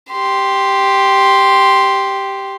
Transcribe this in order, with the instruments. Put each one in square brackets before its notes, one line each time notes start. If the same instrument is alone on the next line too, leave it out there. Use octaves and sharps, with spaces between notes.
[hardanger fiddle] G4 C6